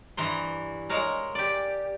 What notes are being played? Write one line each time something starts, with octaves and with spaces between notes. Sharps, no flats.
G2 E3 A#5 C6
G#3 A#4 C#5 F5 A#5
G4 D5